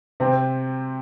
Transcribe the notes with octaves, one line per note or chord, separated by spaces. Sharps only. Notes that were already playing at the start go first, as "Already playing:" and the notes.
C3 C4